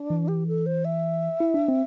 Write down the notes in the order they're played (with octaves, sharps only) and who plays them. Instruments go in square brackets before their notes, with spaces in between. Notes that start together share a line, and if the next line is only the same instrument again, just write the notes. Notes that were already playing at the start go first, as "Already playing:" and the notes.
Already playing: [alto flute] D4
[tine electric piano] E3
[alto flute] G4
A4
C5
E5
[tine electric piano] E4
D4
C4